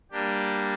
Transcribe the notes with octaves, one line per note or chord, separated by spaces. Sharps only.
G3 A#3 D4 G4